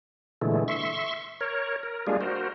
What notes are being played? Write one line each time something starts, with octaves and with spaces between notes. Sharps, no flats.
A#2 D3 E3 G#3 A3
E5 C6 C#6
A#4 C#5
A#4
G3 G#3 A#3 D4 F4 G#4
F#4 A#4 C5